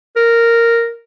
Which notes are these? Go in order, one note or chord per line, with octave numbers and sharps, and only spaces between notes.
A#4